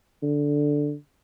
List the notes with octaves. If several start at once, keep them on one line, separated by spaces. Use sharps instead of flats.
D3